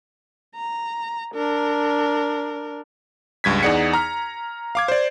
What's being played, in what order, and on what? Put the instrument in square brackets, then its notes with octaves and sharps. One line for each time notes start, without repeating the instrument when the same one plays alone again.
[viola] A#5
D4 A#4
[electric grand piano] C#2 G2 G#6 B6
E2 D#4 G#4 D5 F#5 C#7
A#5 F6
F5 D6 G#6
C5 D5